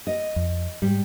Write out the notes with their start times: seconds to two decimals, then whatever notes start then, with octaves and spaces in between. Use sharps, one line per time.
0.07 D#5
0.36 F2
0.82 G#2 G3